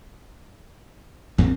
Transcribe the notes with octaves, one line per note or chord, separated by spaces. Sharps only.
A#1 F2 A#3 C4